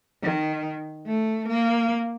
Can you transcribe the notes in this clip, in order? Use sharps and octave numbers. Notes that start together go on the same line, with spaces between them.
D#3
A3
A#3